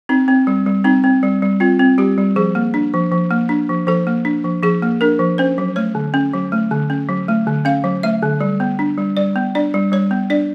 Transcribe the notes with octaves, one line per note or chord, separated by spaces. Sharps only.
C4 D#4
C4
G3
G3
C4 D#4
C4
G3
G3
C4 F4
C4
G3 G4
G3
F3 G#4
A#3
D4
F3
F3
A#3
D4
F3
F3 A4
A#3
D4
F3
F3 G#4
A#3
D4 A#4
F3
C#4 C5
F#3
A3 C#5
D3
C#4
F#3
A3
D3
C#4
F#3
A3
D3
C#4 F5
F#3
A3 E5
D3
G3
B3
D4
G3
G3 D5
B3
D4 D5
G3
G3 C#5
B3
D4 D5